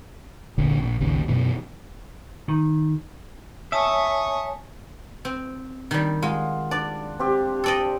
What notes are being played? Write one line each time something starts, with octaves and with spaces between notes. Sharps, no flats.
F1 A#1 E2 D3
A#1
A1 D#2 C#3
F#2 B2 E3
D#3
C#5 E5 G#5 A5 C#6 D#6
C4
D#3 G3
G#3 F4 F#5
D4 D5
C4 G4
A4 D5 D#5